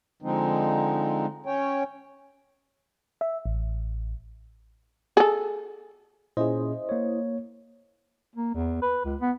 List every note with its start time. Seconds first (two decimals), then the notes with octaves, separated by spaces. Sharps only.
0.22 D3 F3 G#3 C4 D#4
1.46 C#4 C#5 G5
3.21 E5
3.46 A1
5.17 G#4 A4
6.37 A#2 C#4 E4 G#4 C5 D#5
6.89 A#3 C#5
8.36 A#3
8.54 E2
8.82 B4
9.05 C#2
9.21 B3